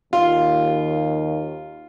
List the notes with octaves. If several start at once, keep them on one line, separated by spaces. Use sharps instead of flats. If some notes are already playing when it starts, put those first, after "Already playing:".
D#2 F4